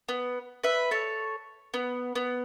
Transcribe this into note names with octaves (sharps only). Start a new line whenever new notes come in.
B3
B4 E5
A4 C#5
B3
B3